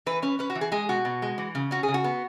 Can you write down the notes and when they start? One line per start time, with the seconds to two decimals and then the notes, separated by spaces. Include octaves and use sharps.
0.06 E3 B4
0.23 C#4 B4
0.39 C#4 B4
0.50 F#4
0.55 E3
0.61 G#4
0.72 G#3 G#4
0.89 B2 F#4
1.05 B2
1.22 G#3
1.38 E3
1.55 C#3
1.71 C#4 F#4
1.83 G#4
1.88 C#3
1.94 F#4
2.04 B3